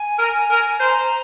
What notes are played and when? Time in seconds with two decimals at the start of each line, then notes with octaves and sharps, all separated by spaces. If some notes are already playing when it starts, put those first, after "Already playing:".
Already playing: G#5
0.19 A#4
0.50 A#4
0.80 C5 A#5